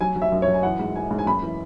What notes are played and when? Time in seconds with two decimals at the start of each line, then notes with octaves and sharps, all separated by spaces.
0.01 F#3 G#5
0.16 F#3
0.22 E5
0.32 F#2
0.42 C#5
0.47 F#3
0.54 G#5
0.63 E3 F#5
0.79 G#2
0.95 E3 G#5
1.11 G#2
1.19 G#5
1.26 F#2 B5
1.43 E3